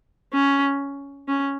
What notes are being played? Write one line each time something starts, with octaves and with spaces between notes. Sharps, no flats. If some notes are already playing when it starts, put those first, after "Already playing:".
C#4
C#4